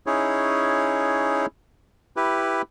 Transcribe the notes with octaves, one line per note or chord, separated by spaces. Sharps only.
C#4 D#4 E4 G#4 C#5
E4 G4 B4